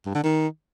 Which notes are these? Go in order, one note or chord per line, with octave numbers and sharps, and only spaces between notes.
G2
D3
D#3